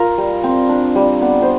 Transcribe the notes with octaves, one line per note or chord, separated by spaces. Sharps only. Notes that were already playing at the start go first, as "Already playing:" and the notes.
Already playing: F4 A#4
G3
C4
D4
G3
B3
C5